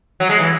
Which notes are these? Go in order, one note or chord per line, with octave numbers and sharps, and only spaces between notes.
F#3
G#3
E3